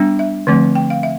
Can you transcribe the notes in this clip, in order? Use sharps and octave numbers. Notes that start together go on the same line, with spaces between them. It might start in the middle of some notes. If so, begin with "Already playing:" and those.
Already playing: G3 B3 D4
E5
D3 F3 A3 C4
G5
F5
E5